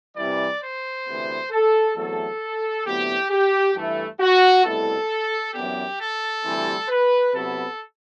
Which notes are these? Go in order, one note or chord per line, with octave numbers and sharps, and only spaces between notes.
C3 E3 G3 D5
C5
D2 C3 E3 B3
A4
E2 C3 F#3 A3 A4
D2 C3 F#3 B3 E4 G4
G4
G2 E3 A3 E4
F#4
C2 B2 A3 E4 A4
F#2 E3 B3 D4 G4
A4
D2 C3 E3 G3 C4
B4
C3 F#3 B3 E4 A4